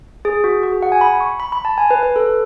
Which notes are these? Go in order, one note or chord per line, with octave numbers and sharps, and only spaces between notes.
G#4
F#4
F#4
G#4
F#5
G#5
B5
C#6
B5
B5
A5
G#5
B4
B4
A4